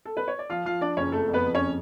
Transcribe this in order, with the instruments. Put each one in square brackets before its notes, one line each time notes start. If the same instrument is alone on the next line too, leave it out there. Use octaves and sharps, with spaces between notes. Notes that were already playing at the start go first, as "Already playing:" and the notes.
[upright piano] A4
B4
C#5
D5
[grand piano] F3 [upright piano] F4 F5
[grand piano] F3 [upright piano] F4 F5
[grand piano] F3 [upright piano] D4 D5
[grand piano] F#1 [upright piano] C#4 C#5
[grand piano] F2 [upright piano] A3 A4
[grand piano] F2
[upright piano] B3 B4
[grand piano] F2
[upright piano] C#4 C#5